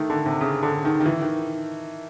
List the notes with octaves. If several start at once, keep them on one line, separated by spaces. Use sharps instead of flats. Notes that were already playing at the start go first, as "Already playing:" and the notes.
Already playing: D#3 A3
D3
C3
C#3
D3
D#3
D#3
E3
D#3